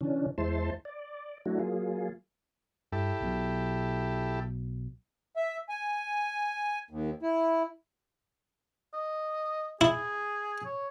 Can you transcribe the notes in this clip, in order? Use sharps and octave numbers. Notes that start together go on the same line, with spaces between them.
C#3 E3 C#4 D4
E2 G#3 E4 C5 A5 C6
D5
F#3 A3 D4 E4 F#4
F#3 A#3 F4 G#4
G2 E4 G4 A4
B1 B2 F#3
E5
G#5
D#2
E4
D#5
E4 G#4
C#5